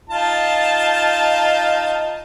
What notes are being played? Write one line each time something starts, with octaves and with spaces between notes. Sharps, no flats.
D#4 F4 A5